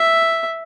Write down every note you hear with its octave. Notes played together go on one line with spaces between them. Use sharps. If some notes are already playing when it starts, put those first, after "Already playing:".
Already playing: E5